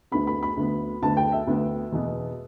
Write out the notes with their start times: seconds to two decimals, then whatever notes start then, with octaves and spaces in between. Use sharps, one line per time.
0.12 D2 D3 B3 B5
0.27 B5
0.43 B5
0.57 D2 D3 B3
1.02 D2 D3 B3 A5
1.17 G5
1.32 E5
1.47 D2 D3 B3
1.92 E2 B2 B3